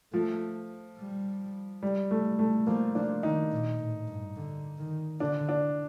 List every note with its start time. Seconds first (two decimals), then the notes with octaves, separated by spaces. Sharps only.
0.13 F3 A3
0.98 G3
1.83 G3
2.11 A3
2.39 A3
2.67 F3 A#3
2.95 F3 D4
3.23 D#3 D#4
3.52 A#2
3.79 A2
4.08 G2
4.36 D3
4.78 D#3
5.20 D3 D4
5.49 D4